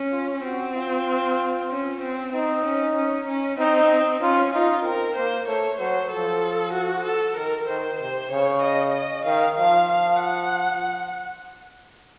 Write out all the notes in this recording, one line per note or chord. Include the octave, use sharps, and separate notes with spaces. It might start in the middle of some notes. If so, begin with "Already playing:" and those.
Already playing: C#4
F4
C4 F#4
F4
C#4
C4
C4 D#4
C#4
C#4
C#4
C4 D#4
C#4 F4
D#4 F4
C4 A#4
A#3 C5
A3 C#5
F#3 C5
F3 A4
F#4
A4
D#3 A#4
D#3 C5
C3 C5
C#3 C#5
D#5
D#5
D#3 F5
F3 F5
F5
F#5